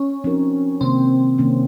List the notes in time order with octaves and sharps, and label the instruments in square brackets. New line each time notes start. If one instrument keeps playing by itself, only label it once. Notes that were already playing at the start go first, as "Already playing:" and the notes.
Already playing: [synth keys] C#4
[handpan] F3 C4 D#4 F#4 A#4
[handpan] C3 D#3 A#3 C#4 [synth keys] C4
[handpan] C3 D#3 A#3 C#4